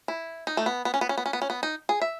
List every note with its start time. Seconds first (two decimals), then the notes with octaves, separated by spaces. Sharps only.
0.08 E4
0.47 D#4
0.57 A3
0.66 B3
0.85 B3
0.94 C#4
1.01 B3
1.09 C#4
1.18 B3
1.26 C#4
1.33 B3
1.42 C#4
1.50 B3
1.63 D#4
1.89 G#4
2.02 E5